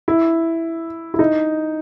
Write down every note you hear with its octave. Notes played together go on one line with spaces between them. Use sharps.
E4
E4
D#4